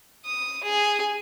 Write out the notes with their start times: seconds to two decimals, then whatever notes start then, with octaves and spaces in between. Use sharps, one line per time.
0.24 D#6
0.63 G#4